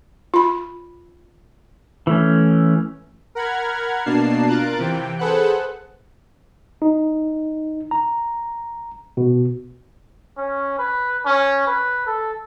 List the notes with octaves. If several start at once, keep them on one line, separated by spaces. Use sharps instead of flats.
F4 B5
E3 A3 C#4
A#4 F#5 B5 F6 G#6
B2 A#3 D4 A5 C7
F4 A#4 F#6 A6 D7
C3 E3 G5
G#4 A4 B4 C5 F#5 F#6
D#4
A#5
B2
C#4
B4
C#4
B4
A4